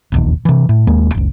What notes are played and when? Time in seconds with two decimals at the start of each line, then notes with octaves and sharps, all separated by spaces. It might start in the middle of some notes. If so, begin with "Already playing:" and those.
0.12 E1 A#1 D#2
0.45 C3 E3
0.69 A2
0.87 D#1 D#2 G#3 A#3
1.14 F#1 C#2